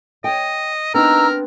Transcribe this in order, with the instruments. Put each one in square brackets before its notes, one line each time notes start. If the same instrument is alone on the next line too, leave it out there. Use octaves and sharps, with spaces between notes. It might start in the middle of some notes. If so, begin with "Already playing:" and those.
[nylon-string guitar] C#5 G5 [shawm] D#5
[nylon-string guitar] B3 C4 D4 [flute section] D#4 A#5 E6 [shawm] A#4